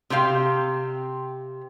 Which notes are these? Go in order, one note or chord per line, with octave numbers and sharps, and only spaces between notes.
C3 C4 G4 F5